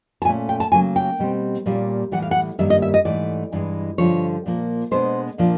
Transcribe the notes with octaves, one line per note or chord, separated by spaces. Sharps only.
A5
A#2 F3 A3 C#4 G#5
G5
A5
C#3 F#3 A#3 G#5
G5
B2 G3 C4
A#2 G3 A#3 C#4
A2 E3 G3 F#5
F5
F#5
G2 D#3 G3 A#3 E5
D#5
E5
D#5
G#2 E3 A3 D5
G2 E3 G#3
G2 D3 F3 C#5
A#2 F3 A#3
B2 G#3 B3 D4 C5
A#2 F3 A#3 D4